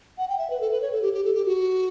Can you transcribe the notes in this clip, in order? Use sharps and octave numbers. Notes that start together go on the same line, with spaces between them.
F#5
G5
E5
B4
A4
B4
C#5
A4
G4
G4
A4
G4
F#4